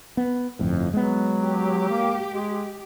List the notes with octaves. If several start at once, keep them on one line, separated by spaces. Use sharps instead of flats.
B3
G1 F2 A2
F#3 G#3 B3
G4
A#3
G#3